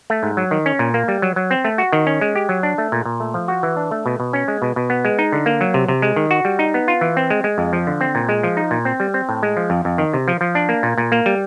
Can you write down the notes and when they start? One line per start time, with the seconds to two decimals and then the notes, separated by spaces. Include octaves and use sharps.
0.10 A3
0.23 G#2
0.37 F#3
0.51 D#3
0.66 C#4
0.79 A#2
0.94 A#3
1.08 G3
1.22 F#3
1.36 F#3
1.51 C4
1.65 A3
1.78 F#4
1.93 D#3
2.07 C#4
2.21 G#3
2.36 G4
2.49 F#3
2.63 D4
2.78 A3
2.92 A#2
3.05 A#2
3.20 A3
3.34 F3
3.48 F#4
3.63 E3
3.77 D4
3.91 A3
4.06 B2
4.20 B2
4.33 C#4
4.48 G#3
4.62 B2
4.76 B2
4.90 B3
5.05 G#3
5.19 D#4
5.32 D3
5.46 A#3
5.61 F#3
5.74 C3
5.88 C3
6.02 G#3
6.16 D#3
6.31 F#4
6.45 G3
6.59 D#4
6.74 B3
6.88 F4
7.01 E3
7.17 C4
7.30 G#3
7.44 G#3
7.58 F2
7.73 F3
7.87 D3
8.01 C4
8.15 A#2
8.29 G#3
8.43 F3
8.57 D#4
8.71 A#2
8.85 C4
9.00 G3
9.14 C4
9.29 A2
9.43 G#3
9.57 F3
9.70 F2
9.85 F2
9.98 D#3
10.13 C3
10.28 F3
10.41 F3
10.55 D4
10.69 A#3
10.83 A#2
10.98 A#2
11.12 A#3
11.26 G3